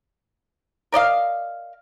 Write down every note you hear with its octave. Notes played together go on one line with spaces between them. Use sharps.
A#4 D5 D#5 F5